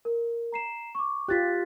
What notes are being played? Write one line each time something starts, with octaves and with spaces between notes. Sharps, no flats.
A#4
A#5 C7 E7
C#6 D6
F4 G4 F#6 A6 B6